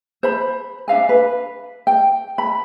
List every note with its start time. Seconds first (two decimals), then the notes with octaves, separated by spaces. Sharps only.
0.23 C5 B5
0.88 D4 E5 F5 G#5
1.09 B4
1.87 G5
2.38 B5